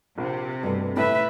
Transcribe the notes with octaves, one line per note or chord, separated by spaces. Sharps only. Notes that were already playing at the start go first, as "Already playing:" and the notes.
A#1 C3
G2 B2 A3
A2 E4 B4 E5